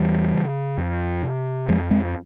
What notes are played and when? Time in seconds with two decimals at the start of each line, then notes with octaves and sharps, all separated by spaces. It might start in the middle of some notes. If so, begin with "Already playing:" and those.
Already playing: E2 E3 G3
0.33 C#3
0.77 F2
1.23 C3
1.68 F2 F3 G#3
1.91 G#3 C4